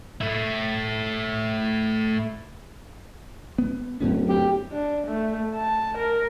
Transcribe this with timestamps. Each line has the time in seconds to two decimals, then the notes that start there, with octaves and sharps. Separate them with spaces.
0.21 A3 E4
3.58 B3
4.00 D1 F#2 B3 C#4
4.29 G4
4.72 D4
5.07 A3
5.54 A5
5.98 A#4